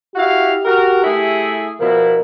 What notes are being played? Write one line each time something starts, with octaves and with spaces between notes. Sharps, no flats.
E4 F#4 G4 F5
F#4 A#4
A3 E4 G#4
B2 F3 E4 A#4